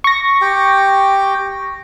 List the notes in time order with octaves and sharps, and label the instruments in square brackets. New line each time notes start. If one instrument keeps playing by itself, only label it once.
[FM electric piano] C#6 A#6
[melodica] G4 G5